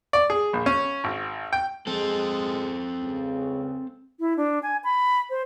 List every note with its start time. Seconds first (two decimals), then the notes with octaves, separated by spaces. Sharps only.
0.13 D5
0.30 G#4
0.53 A#1
0.66 C#4
1.04 G#1
1.53 G5
1.87 G#3 C4 A4
3.02 C#2 C#3
4.20 E4
4.37 D4
4.63 G#5
4.84 B5
5.30 C5